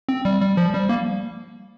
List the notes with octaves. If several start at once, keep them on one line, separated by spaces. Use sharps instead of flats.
C4
G3
G3
F3
G3
A#3